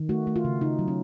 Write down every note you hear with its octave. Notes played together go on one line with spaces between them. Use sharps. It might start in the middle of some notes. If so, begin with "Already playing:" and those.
Already playing: D#3
A3 F#4
A3
F4
C#3
C#3 D#4
F#3
C#4